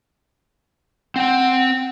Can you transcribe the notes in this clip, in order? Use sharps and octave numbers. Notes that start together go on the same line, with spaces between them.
C4 F#5 G5